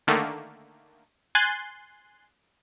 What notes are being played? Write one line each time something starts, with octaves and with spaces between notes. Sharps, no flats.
D3 D#3 A3 A#3
G#5 C6 F#6 A6